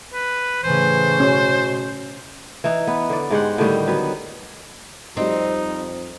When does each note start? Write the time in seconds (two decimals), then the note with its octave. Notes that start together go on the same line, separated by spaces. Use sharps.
0.13 B4
0.64 A2 C#3 E3 C5
1.20 B2 C#4
2.64 E3 D#4
2.87 B3
3.09 D3 D5
3.30 G#2 G#3 G4 F#5
3.58 A2 D3 D#3 G3
3.87 F#3 B3 B4
5.17 F2 G3 C4 D#4 D#5